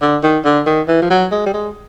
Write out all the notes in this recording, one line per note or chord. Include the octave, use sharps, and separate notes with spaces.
D3
D#3
D3
D#3
E3
F3
F#3
G#3
G3
G#3